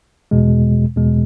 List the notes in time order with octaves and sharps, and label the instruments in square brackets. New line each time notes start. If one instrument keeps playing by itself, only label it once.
[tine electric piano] E2 B2 G#3
E2 B2 G#3